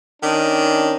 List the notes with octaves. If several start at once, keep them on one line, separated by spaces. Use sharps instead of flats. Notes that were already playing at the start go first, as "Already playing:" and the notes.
D#3 C#4 D4